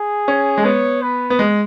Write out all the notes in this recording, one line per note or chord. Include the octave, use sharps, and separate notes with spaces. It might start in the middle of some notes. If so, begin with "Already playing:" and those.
Already playing: G#4
C#4
G#3
B3 C#5
B4
B3
G#3